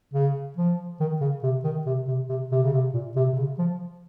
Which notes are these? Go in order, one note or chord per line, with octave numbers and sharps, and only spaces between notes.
C#3
F3
D#3
C#3
C3
D#3
C3
C3
C3
C3
C#3
C3
A#2
C3
C3
C#3
F3